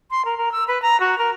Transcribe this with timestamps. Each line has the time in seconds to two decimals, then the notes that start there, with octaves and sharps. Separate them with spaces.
0.11 C6
0.25 A#4
0.37 A#4
0.52 E6
0.68 B4
0.82 A#5
1.00 F#4
1.18 A#4